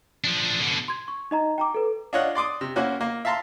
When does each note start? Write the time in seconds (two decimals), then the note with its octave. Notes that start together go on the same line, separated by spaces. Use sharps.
0.24 F3 D4
0.59 B2 D3
0.88 C6 G#6
1.08 C#6
1.31 D#4 D#5 A#5
1.58 G5 A#5 D6
1.74 A4 B4
2.13 D4 F4 C#5 D#5 F#5
2.35 D5 C6 D6 D#6
2.61 C3
2.76 A#3 C#4 E4 F#4 C5
3.01 A#3
3.25 E5 F5 A5 A#5 C6